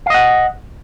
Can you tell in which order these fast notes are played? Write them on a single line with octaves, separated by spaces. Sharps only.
F5 D#5 F#5